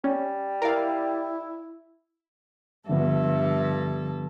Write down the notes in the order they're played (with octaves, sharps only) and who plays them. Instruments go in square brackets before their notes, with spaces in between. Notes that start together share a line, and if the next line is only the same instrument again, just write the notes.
[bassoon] G3 [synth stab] C#4
[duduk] E4 [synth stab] A#4 D5 F5
[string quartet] G2 A4 [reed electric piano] D3 F3 B3 [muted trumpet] E5